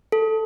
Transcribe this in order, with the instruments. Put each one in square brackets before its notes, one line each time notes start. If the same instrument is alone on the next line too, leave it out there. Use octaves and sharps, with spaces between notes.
[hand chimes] A4